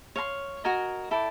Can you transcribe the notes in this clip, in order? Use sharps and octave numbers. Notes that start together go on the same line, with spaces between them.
C#5 F5 A5 C6
F#4 A#4 D#5 G#5
E4 A4 D5 G5